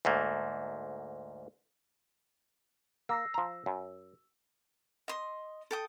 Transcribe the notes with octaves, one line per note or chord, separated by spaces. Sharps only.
D2 G#2 A3 A#3
A#3 E6 A#6 C7
F3 A#5
F#2
D#5 C6
A4 G5 D#6